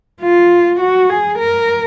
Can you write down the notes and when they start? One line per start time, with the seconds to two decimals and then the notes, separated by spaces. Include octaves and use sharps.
0.22 F4
0.80 F#4
1.09 G#4
1.38 A#4